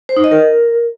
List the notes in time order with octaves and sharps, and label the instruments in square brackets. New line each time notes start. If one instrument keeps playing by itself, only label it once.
[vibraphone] C5
D#4
D#5
A#4